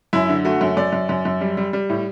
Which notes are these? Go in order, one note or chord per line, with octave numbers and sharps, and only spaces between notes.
F#2 E4
D3
A3 F#4
F#2
F#2 D5
F#2
F#2
F#2
G3
G3
G3
A2